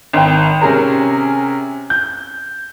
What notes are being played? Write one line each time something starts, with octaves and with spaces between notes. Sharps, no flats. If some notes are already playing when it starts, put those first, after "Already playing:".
G#1 G5
C3 C#4 G#4 A#4
G6